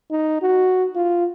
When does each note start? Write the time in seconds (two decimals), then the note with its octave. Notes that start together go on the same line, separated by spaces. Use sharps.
0.11 D#4
0.42 F#4
0.95 F4